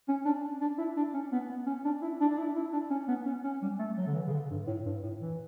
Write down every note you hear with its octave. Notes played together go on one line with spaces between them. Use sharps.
C#4
D4
D4
E4
D4
C#4
B3
B3
C#4
D4
E4
D4
D4
E4
E4
D4
C#4
B3
C#4
C#4
G3
A3
F#3
D3
E3
C#3
D3
G2
A2
G2
A2
E3